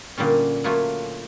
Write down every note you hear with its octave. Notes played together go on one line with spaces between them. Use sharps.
A#2 D3 G3 C#4
A#2 F#3 A3 F4 F#4 G#5